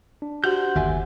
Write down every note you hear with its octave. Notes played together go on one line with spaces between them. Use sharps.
D4
F#4 G4 C5 F#5 G6
G1 D#2 D3 E5 G#5